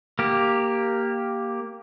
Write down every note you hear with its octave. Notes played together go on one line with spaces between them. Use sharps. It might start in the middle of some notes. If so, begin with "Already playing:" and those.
A#3 G4